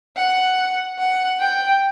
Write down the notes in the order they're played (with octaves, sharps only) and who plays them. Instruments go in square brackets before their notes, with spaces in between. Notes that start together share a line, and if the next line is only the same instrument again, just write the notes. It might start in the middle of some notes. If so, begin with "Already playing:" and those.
[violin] F#5
F#5
G5